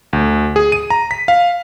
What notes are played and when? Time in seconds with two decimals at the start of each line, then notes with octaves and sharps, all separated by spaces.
0.13 D2
0.56 G#4
0.72 D#7
0.90 A#5
1.11 B6
1.28 F5